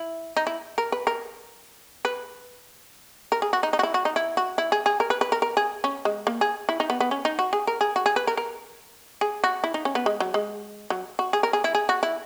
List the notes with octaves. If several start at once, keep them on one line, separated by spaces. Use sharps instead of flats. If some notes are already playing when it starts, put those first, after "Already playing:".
Already playing: E4
D#4
E4
A#4
B4
A#4
B4
A#4
G#4
F#4
D#4
D#4
F#4
E4
F#4
D#4
E4
F#4
E4
G#4
G#4
A#4
B4
B4
A#4
A#4
G#4
C#4
G#3
A#3
G#4
E4
D#4
B3
B3
C#4
D#4
F#4
G#4
A#4
G#4
F#4
G#4
B4
A#4
A#4
G#4
F#4
E4
D#4
C#4
B3
G#3
F#3
G#3
F#3
F#4
G#4
A#4
G#4
E4
G#4
F#4
E4